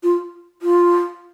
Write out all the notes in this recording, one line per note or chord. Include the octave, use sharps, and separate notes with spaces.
F4
F4